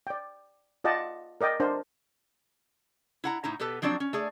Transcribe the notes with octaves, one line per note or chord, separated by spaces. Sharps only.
D5 G5
F4 D5 D#5 F#5 G5 A5
A#4 D5 D#5 G5
D4 A#4 C5
E4 F#5 A#5
A2 D#4 E4 A#5
B2 B3 G4 A4 B4
F3 F#3 C4 D4 D5
C#4
A3 G#4 D5